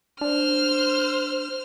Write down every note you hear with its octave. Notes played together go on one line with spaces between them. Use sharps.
D4 C5 F6